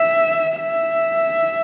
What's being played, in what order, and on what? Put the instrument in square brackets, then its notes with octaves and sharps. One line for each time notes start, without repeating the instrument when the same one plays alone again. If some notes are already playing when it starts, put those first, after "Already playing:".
Already playing: [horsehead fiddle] E5
E5